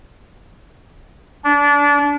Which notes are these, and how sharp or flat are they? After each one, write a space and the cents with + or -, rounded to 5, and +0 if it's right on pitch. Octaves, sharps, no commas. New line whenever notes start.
D4 -25